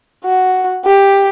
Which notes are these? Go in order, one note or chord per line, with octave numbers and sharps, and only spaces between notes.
F#4
G4